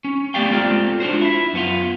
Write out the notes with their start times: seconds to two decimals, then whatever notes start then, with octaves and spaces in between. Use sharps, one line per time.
0.04 C#4
0.34 A3 B3 G4 D5 F5 G5
0.50 G#3 A#3 C4 F4 A4 D5
1.00 D4 F4 F#4 C5
1.21 E4 E5
1.53 F#2 B3 F4